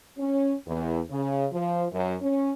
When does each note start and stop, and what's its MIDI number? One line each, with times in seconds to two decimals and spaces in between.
0.18 0.54 61
0.67 0.99 40
1.10 1.46 49
1.52 1.85 53
1.92 2.15 42
2.21 2.52 61